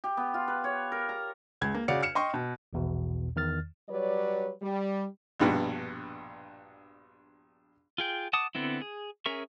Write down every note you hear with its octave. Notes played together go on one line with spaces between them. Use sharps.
G4
B3
F4
B4
C#5
A#4
A#5
C#2 G#6
A#3
C#3 F#4 D5 F5 C#7
F6 C#7 E7
D#5 G5 C6 C#6
B2
A#1 E2 B2
E2 D#3 F6 A6
F#3 G3 B4 C#5 D5
G3
A#1 G2 B2
F4 G#4 G5
F#5 A5 D6 D#6
D3 B3 C4 E4
G#4
C#4 G#4 A#4 E5 C#6